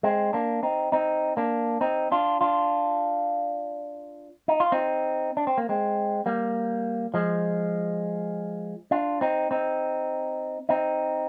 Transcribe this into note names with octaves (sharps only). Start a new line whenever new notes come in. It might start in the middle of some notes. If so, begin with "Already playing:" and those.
G#3 C4
A#3 D4
C4 D#4
C4 D#4
A#3 D4
C4 D#4
D4 F4
D4 F4
D#4
F4
C4 D#4
D4
C4
A#3
G#3 C4
G3 A#3
F3 G#3
D4 F4
C4 D#4
C4 D#4
C4 D#4